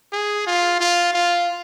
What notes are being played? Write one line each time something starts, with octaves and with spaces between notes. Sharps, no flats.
G#4
F4
F4
F4